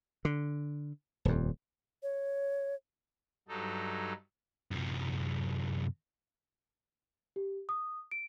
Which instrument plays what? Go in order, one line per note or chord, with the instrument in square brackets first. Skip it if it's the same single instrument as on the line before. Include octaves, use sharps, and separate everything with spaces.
[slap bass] D3
D#1 F2
[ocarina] C#5
[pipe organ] G2 F#3 D#4 A4
[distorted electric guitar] F#2 C3
[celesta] G4
D#6
D7